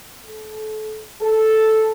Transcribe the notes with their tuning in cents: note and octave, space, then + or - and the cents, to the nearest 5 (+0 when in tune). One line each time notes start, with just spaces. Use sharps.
A4 -30
A4 -5